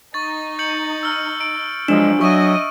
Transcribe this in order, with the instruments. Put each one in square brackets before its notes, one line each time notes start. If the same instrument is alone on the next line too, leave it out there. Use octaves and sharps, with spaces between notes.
[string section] D#4 [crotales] C#6 A6
[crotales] G6 C#7 F#7
E6 F6
D7
[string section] F3 F#3 [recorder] G#3 [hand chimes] D4
[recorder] F#3 [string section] D#5 E5 [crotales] C#6 D#7